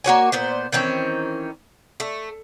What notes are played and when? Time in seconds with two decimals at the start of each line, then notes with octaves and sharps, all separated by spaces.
0.04 A#3 F#4 C#5 G#5
0.32 A#2 B3 C5
0.72 D#3 E3 C4 C#4
2.00 A3